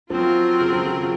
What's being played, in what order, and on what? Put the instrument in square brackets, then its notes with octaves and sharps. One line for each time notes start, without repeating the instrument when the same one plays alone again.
[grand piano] F3 [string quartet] F#3 C4 F4 A#4
[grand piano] C#3
F3
C#3